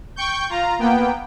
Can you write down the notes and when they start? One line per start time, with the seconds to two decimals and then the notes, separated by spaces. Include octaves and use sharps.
0.16 G5 C#6 G6
0.49 F4 A#5
0.79 A#3 B3 G5